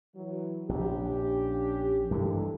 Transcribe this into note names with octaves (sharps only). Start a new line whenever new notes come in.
E3 F#3
A#1 C#4 D4 G4
G2 E3 G#3 A4 A#4